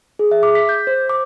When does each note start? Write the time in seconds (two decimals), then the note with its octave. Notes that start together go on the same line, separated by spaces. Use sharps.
0.19 G#4
0.31 E5
0.43 D6
0.55 B6
0.69 G6
0.87 C5
1.09 D6